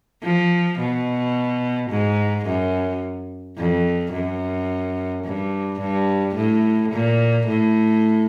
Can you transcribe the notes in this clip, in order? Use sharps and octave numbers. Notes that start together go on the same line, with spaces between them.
F3
B2
G#2
F#2
F2
F#2
G2
G2
A2
A#2
A2